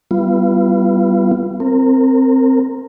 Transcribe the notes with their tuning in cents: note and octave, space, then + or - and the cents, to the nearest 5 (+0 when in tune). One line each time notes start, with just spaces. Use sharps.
G3 -20 B3 +0 F4 -35
C4 +0 A#4 -20